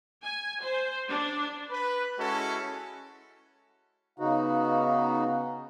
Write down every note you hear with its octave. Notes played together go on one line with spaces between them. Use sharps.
G#5
C5
D4
B4
G#3 C#4 E4 F#4 A4
C#3 B3 D#4 F#4 B4 F5